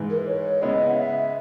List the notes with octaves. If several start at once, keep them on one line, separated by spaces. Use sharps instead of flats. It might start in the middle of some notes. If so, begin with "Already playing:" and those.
Already playing: G#2 E3 G#3
A#4
B4
C#5
C#3 G#3 B3 E4 G#4 D#5
F#5
E5